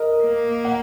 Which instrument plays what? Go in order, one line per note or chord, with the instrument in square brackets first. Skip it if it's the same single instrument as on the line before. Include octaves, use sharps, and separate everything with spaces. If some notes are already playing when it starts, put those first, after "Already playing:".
Already playing: [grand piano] A#4 D#5
[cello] A#3
[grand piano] F#5